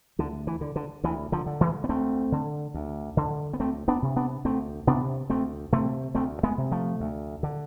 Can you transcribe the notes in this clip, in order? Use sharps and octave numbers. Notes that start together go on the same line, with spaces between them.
D2 D3
E3
D3
D3
D2 E3
D3 F3
D3
E3 G#3
B3
D2 A3 C4
D3
D2
D3
B3
D2 A3 C4
B3 D4
C3
B3 D4
D2 A3 C4
C3 B3 D4
D2 A3 C4
C3 A3 C4
D2 A3 C4
G#3 B3
C3
F3 A3
D2
D3